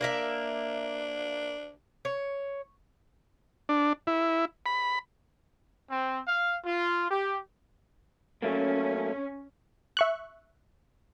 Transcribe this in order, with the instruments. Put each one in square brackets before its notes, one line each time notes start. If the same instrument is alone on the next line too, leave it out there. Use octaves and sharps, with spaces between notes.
[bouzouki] A#3 A#4 E5 [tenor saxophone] D4
[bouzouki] C#5
[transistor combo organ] D4
E4
B5
[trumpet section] C4
F5
F4
G4
[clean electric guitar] F#3 A3 A#3 [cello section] C#4
[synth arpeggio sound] E5 C#6 F#6